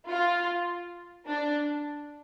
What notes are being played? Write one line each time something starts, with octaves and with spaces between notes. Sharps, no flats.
F4
D4